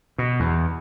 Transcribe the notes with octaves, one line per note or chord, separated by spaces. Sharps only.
B2
E2